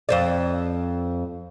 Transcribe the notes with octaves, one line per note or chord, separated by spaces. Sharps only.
F2 C5 D5